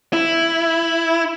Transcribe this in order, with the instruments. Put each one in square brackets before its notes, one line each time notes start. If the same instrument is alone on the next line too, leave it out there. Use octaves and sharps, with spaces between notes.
[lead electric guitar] E4